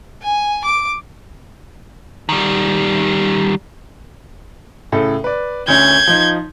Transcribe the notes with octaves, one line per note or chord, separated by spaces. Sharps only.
G#5
D6
D#3 G3
A2 C#3 A4
B4 D5
D2 C#4 G6 G#6
F3 D#4